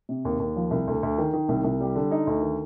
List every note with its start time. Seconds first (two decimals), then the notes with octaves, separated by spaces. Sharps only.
0.09 C3
0.25 D#2
0.40 D#2
0.56 F3
0.71 C2
0.87 D2
1.03 D2
1.18 D#3
1.33 D#3
1.49 C2
1.64 C2
1.81 G3
1.95 D3
2.11 D#4
2.27 D2
2.42 D#3